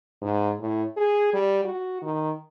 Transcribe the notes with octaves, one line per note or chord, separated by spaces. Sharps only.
G#2
A2
G#4
G3
F#4
D#3